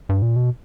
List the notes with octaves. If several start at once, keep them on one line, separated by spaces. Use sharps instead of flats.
G2
A#2
B2